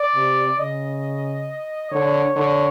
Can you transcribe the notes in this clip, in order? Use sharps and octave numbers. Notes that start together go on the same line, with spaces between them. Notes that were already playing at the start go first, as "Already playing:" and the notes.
Already playing: D5
C3
C#3 D#5
D3 C#5
D3 C#5